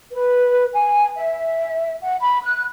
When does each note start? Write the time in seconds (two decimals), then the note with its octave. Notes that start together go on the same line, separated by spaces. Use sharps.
0.13 B4
0.72 G#5
1.16 E5
2.01 F#5
2.19 B5
2.43 F#6